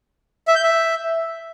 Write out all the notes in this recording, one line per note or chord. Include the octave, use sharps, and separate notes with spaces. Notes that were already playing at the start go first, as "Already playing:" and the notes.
E5
G6
E5